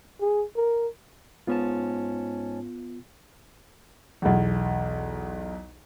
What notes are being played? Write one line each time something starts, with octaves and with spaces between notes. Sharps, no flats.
G#4
A#4
G#2 B3 C#4 F4 A5
B1 E2